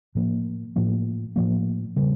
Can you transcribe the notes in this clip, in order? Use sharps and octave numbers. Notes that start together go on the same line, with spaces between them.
A2 F3 A#3
A2 F3 A#3
A2 F3 A#3
C#3 G3 C#4